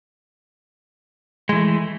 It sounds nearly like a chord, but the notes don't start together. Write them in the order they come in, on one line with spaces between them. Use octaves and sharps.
G#3 E3 A3